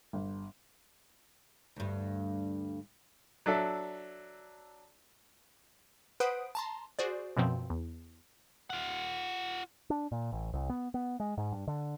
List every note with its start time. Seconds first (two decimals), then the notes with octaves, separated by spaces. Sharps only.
0.13 G1
1.76 D2 G2
3.46 F#3 D4 A4 E5
6.20 B4 C5 F#5 D#6 D7
6.55 A5 A#5 C6
6.99 F#4 G#4 C5 D5
7.36 F#2 B2 F3 C4
7.70 E2
8.70 F4 F#5
9.90 D4
10.12 A#2
10.32 A1
10.53 C2
10.70 B3
10.94 B3
11.20 G#3
11.38 G#2
11.52 G2
11.67 D3